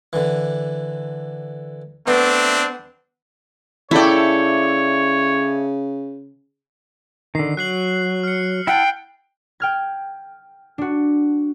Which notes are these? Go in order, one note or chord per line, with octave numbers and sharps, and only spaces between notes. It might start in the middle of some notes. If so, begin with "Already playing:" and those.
D3 E3
A3 B3 C4 D4
C#3 A3 E4 A4 C#5 D5 G5
D3 D#3 C7
F#3 F#6 C7 F#7
F6 C#7
E4 F#5 G5 A5
G5 F6 G#6
D4 F#4